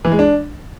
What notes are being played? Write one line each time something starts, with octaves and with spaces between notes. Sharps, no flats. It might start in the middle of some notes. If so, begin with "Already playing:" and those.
E3
G#3
D4